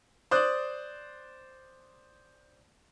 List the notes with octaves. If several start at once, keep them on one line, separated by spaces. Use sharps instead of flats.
C5 D5 D#6 F#6